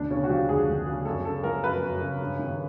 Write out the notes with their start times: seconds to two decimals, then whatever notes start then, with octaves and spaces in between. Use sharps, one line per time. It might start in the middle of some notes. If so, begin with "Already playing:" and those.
Already playing: D2 B2 D4
0.10 C#3 C#4
0.24 F#4
0.29 F3 G4
0.49 D2 G#4
0.68 D2
0.87 C#3
1.05 F#2 A4
1.25 C#3 A4
1.44 F3 A#4
1.64 F#2 B4
1.83 F#2
2.02 C#3
2.20 G2
2.39 D#3